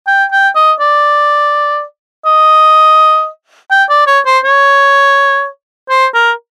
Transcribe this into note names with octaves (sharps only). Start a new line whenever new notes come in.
G5
G5
D#5
D5
D#5
G5
D5
C#5
C5
C#5
C5
A#4